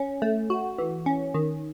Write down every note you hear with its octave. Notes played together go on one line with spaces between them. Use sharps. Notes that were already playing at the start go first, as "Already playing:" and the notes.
Already playing: C#4
A3
F#4
E3
C#4
D#3